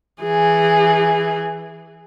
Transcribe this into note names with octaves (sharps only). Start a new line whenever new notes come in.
E3 G#4